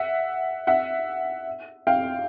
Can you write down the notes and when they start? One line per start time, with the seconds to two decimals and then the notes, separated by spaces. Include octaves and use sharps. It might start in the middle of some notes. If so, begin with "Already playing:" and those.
Already playing: E5 F#5
0.67 E5 F#5
1.87 F5 G5